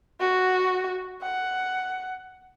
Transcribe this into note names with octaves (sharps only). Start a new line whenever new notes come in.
F#4
F#5